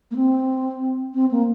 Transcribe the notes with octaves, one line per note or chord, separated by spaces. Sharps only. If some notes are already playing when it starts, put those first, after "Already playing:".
A#3
C4
C4
A#3